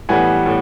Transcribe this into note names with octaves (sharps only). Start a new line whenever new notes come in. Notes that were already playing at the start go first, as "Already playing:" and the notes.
A2 E3 G3 B3 F#5 G#5
A2